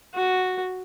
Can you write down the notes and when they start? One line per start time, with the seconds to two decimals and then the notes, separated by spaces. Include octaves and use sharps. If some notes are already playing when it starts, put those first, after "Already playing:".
0.14 F#4